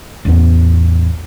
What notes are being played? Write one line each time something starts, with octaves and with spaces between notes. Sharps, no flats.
A1 E2 B3